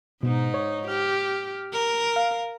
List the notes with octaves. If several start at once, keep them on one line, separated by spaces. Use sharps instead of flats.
G#2 B2 D#4
C#5
G4 F6
A#4
F5